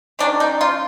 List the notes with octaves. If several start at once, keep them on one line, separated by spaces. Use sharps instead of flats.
D#3 F#3 A#3 C#4 D4
D#4
F4